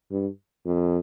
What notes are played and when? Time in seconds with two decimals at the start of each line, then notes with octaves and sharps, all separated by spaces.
0.11 G2
0.65 F2